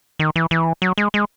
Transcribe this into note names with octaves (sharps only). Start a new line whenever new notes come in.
D#3
E3
E3
F#3
G#3
G#3